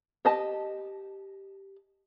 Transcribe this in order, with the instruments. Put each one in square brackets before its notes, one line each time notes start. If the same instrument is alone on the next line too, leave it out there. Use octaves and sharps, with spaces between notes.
[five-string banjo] G4 D#5 A5